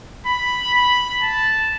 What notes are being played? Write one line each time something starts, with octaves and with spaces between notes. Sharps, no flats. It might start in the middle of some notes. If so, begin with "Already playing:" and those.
B5
B5
A5